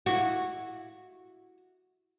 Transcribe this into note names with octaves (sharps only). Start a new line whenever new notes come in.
E4 F#4